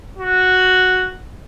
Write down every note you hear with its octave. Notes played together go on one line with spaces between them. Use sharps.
F#4